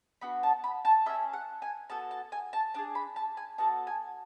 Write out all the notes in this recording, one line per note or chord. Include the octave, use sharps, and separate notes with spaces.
B3 D4 F#4 B5
A5
B5
A5
C#4 G#4 E5
F#5
G#5
B3 F#4 A4 A5
A5
G#5
A5
D4 G#4 A5
B5
A5
G#5
B3 F#4 A4 A5
G#5